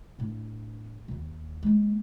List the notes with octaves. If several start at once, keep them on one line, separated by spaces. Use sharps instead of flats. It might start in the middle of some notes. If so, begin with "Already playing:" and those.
A2 D4
E1 D#2
G#3 A#3